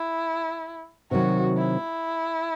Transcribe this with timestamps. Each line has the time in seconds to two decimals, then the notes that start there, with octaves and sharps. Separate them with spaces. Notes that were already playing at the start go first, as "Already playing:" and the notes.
Already playing: E4
1.10 C3 D#3 F#3 F#4
1.57 E4